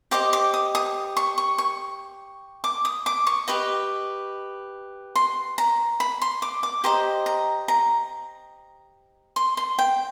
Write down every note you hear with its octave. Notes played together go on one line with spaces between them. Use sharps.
G4 C5 D#5 D6
D6
D#6
D#6
C#6
C#6
C#6
D6
D#6
D6
C#6
G4 B4 D#5
C6
A#5
B5
C6
D6
D6
G4 C5 D#5 A#5
A#5
A#5
C6
C6
G5